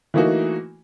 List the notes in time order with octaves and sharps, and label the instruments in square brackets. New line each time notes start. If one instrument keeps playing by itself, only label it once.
[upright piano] E3 A3 A#3 D#4 F#4